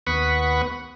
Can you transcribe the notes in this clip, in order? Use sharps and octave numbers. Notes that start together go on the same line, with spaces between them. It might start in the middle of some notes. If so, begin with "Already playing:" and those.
D#2 B3 B4 F#5 B5 C#6